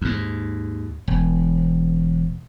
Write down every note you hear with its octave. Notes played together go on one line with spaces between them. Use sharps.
D#2 G#2
E1